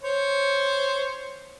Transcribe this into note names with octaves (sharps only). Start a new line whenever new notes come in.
C5 C#5